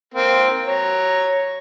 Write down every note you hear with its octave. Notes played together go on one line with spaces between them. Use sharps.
A#3 C4
C#5 A#5